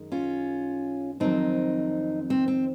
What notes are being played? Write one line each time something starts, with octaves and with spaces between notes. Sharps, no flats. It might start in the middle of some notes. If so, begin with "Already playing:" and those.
Already playing: F#2 D#3 G#3
C#4 F4
F2 D#3 F#3 C4 D#4
C4
C4